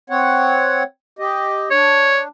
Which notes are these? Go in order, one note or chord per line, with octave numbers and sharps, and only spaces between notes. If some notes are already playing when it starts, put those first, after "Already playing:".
C4 C#5 F#5
G4 D#5
D4 C#5